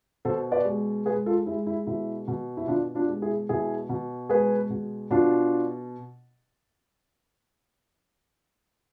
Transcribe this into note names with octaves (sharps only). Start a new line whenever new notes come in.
B2 A4 C5
B4 D5
G#3
G#3 G#4 B4
F4 A4
G#3 E4
E4
B2 E4
B2
E4
B2 D4 F4
D4 F4
G#3
E4 G#4
B2 E4 G#4
B2
G#3 G#4 B4
B2
B2 D4 F4